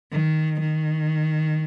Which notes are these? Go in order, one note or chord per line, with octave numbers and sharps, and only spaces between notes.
D#3
D#3